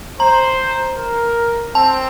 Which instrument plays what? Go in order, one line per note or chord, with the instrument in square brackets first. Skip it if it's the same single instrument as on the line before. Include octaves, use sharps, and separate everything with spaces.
[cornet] C5 [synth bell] A#5
[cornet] A#4
[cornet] C4 [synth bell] A5